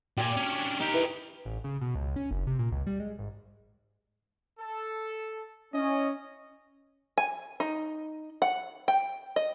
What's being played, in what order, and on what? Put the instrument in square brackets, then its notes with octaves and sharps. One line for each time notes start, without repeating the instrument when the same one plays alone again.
[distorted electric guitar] A#2 [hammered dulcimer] G4 G#5
[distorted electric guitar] C#4 D4
[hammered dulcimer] D#4 [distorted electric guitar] G4 A#4
[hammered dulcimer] E3
[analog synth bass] A1
C#3
B2
C#2
C#4
F#1
C3
A#2
C#2
G3
G#3
G#1
[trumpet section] A4
[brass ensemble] C#4 [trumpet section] E4 D#5
[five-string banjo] G#5
D#4
F#5
G5
D#5